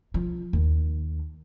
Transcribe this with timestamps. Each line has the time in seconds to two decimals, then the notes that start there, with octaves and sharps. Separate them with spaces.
0.14 F3
0.53 D#2